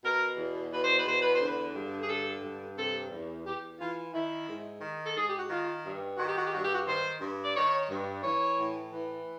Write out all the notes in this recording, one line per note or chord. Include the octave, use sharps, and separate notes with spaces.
B2 A#4
E2
B2 B4
C5
B4
E2 C5
B4
C5
D3
B4
G2
G#4
D3 A4
G2
C3 A4
E2
E2 G4
E3 F4
D#3 E4
G#2
D#3
A4
G#2 G#4
G4
F#4
D#3 F4
G2
D#3 F#4
G4
F#4
G4
G2 F#4
G4
F#4
D#3 C5
G2
D5
D#3 C#5
G2
E3 C#5
A2
E3